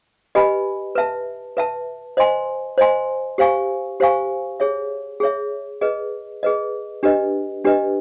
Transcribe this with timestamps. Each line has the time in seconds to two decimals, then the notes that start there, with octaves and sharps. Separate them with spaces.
0.35 G4 B4 D#5 G#5 B5
0.95 B4 E5 A5
1.57 B4 E5 A5
2.17 C5 D#5 G#5 C6
2.78 C5 D#5 G#5 C6
3.38 G4 C5 F5 G#5 C#6
4.00 G4 C5 F5 G#5 C#6
4.60 G#4 C#5 E5
5.20 G#4 C#5 E5
5.81 G#4 B4 D#5
6.43 G#4 B4 D#5
7.03 D4 G4 B4 D#5
7.64 D4 G4 B4 D#5